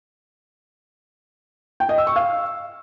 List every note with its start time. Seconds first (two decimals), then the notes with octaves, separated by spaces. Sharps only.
1.80 G5
1.89 D#5
1.98 E6
2.07 C#6
2.16 F5